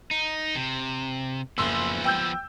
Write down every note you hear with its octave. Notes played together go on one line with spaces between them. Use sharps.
D#4
C3
F#1 F3 B3 C6 E6
G5 E6 G6